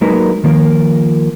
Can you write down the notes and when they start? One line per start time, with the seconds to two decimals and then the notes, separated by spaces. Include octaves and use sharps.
0.01 F#3 G#3 A#3 D#4 A#4 B4
0.44 D#3 F3 A#3 F4 A#4